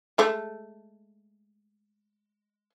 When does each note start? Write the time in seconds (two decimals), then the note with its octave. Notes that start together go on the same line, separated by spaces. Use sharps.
0.18 G#3 A3 A4